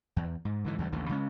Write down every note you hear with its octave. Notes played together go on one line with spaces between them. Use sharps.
E2
G#2
G#2 D3 E3
E2 D3 F#3 G3
A1 D#2 D3 E3
C#3 G#3 C#4